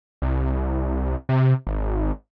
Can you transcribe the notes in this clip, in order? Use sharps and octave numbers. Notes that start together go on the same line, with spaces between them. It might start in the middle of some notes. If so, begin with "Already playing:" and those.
C2
C3
G#1